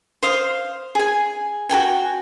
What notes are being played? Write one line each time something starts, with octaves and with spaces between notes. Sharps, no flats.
C5 F5 D#6
G#4 G#5
F#4 A4 G5 G#5